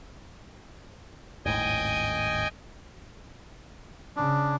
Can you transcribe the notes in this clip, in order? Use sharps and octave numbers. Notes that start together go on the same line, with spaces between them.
D#1 G#1 A2 D#5 G5 G#5
C#3 D4